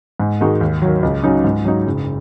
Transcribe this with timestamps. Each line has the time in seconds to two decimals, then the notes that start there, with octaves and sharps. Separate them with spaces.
0.20 G#2
0.41 D#3 G#3 D#4 F#4
0.61 D#2
0.82 D#3 F#3
1.03 C#2
1.24 C#3 F#3 D#4
1.44 G#2
1.65 F#3 D#4
1.87 F#1